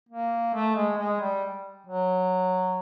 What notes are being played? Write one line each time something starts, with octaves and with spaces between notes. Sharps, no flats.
A#3
A3
G#3
G#3
G3
F#3